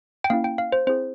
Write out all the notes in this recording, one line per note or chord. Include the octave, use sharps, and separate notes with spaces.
G5
A#3 C#4 E4 F5
G5
F5
C5
C4 E4 G#4 C5